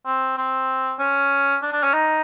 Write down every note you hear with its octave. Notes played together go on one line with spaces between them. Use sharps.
C4
C4
C#4
D4
D4
C#4
D#4